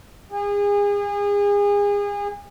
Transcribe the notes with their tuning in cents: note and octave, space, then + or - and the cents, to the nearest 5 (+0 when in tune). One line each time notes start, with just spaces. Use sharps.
G#4 -35